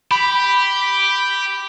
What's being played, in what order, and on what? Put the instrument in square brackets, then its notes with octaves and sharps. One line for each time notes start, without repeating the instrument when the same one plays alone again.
[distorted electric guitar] G4 [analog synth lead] B5